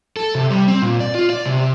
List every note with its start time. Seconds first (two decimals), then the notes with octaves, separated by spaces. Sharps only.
0.17 A4
0.35 C3
0.51 G3
0.68 C4
0.82 A#2
1.00 D5
1.15 F4
1.30 D5
1.45 C3